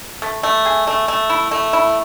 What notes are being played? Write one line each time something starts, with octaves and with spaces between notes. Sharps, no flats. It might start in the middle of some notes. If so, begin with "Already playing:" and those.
A3
A3
G#4
A3
A3
E4
A3
E4